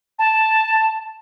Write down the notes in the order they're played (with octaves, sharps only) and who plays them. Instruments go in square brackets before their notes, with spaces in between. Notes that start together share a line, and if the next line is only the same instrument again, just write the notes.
[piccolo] A5